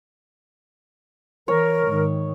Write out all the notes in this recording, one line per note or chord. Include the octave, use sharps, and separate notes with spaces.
E3 A#4 C#5
G#2 D#3